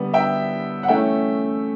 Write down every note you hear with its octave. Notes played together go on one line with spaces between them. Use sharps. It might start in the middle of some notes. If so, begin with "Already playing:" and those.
Already playing: D3 G3 B3
E5 G5
F#5
E3 A3 C#4 E5 G5